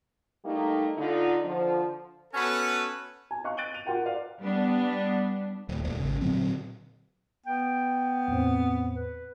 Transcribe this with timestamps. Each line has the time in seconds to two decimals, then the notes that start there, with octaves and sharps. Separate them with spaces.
0.45 G3 A3 A#3 D#4
0.97 D3 D#4 F4
1.44 D3 F3
2.34 B3 C#4 F#4 A4 B4
3.31 G#5
3.44 D#5 F5 C#6 F#6
3.57 F#6 A6 D7 D#7 F#7 G7
3.74 D#7 F7
3.86 F4 A#4 F#5 G5
4.06 D5 F5
4.41 G3 B3 D4
5.69 D1
5.84 D#1
6.00 G#1 C#3
6.21 A#2 D3 F#3 C4
7.46 B3 G5
8.28 E2 A2 C4
8.95 B4